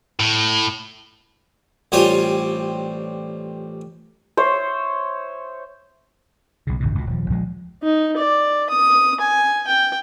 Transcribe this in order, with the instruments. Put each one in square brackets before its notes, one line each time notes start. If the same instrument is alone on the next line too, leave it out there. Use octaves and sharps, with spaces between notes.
[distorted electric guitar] A2
[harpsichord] A1 G3 C4 F4 C#5 G#5
[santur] C5 C#5 E5
[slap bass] B1 C#3
A1 D2 G2 B2
C#2 B2
D#1 F3
A#1 F3 G#3
[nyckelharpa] D#4
D5
D#6
G#5
G5